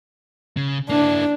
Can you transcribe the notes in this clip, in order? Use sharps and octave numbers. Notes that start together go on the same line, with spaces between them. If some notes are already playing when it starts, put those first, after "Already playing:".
C#3
A#3 D4 E4